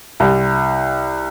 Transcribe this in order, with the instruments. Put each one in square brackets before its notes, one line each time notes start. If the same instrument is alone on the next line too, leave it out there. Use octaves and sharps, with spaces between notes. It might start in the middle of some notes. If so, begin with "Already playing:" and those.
[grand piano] C2